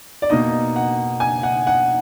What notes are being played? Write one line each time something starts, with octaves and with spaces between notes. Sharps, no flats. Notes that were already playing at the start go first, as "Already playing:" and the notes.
D5
B2 A#3 D#4 D#5
F#5
G#5
F#5
F#5